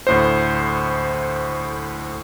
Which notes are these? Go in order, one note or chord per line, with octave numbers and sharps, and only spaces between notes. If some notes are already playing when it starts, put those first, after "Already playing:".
D2 A2 C5